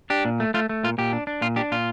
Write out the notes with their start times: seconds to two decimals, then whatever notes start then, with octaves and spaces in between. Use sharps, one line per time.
0.10 D4 G4
0.25 A#2
0.40 A3
0.54 A3 F4
0.69 A3
0.84 A#2 F4
0.98 A#2 G4
1.13 D4
1.27 D4
1.41 A#2 F4
1.56 D4 G4
1.72 A#2 F4